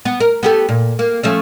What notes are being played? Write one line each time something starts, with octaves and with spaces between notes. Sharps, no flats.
B3
A#4
B3 G4 A4
A#2
A#3
F3 A3 C#4